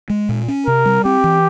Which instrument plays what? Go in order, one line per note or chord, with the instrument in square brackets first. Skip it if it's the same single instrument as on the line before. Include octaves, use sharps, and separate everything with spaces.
[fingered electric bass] G#3
A#2
C#4
[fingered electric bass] C3 [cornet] A#4
[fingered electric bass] G3
[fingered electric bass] C4 [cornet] G4
[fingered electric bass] E3